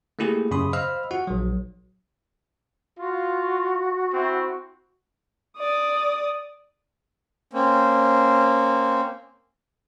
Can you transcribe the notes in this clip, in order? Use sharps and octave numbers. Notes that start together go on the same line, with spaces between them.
A3 A#3 E4 G4 G#4
F#2 C#3 B5 C6 D#6
C5 D#5 F5 B5 E6 F6
F4 F#4 F#5
A#1 F#3
F4 F#4
C4 E4
D5 D#6
A#3 C4 C#4